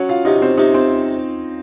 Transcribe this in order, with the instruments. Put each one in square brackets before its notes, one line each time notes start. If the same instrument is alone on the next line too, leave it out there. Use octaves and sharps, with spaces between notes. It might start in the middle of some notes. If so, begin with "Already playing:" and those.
Already playing: [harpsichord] F#3 [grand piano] C#4 C#5
[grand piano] F4 F5
[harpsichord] C3 [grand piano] D#4 D#5
[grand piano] C4 C5
[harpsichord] C3 [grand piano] D#4 D#5
[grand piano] C4 C5